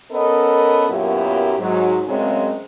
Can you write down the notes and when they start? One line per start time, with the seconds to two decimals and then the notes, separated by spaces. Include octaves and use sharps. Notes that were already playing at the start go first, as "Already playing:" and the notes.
0.12 B3 C#4 A4 A#4 D#5
0.89 F#2 A#2 F#3 B3 E4 G4
1.59 G#2 F#3
2.07 A#2 C#3 F#3 G#3 A3 C4